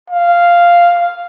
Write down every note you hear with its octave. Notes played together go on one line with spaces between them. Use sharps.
F5